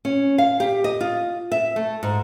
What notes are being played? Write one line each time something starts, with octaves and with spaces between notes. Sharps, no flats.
C#4
F5
G4
D#5
F4
E5
A3
G#2